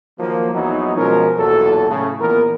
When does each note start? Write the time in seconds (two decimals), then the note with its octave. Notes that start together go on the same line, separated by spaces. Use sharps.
0.18 D#3 F3 F#3 A#3
0.54 A#1 E3 F#3 B3 D#4
0.95 B2 F3 G#3 C#4 F4 A#4
1.37 B1 E2 A#2 F#3 A4
1.89 A2 C#3
2.19 A#1 A#2 E3 B3 A#4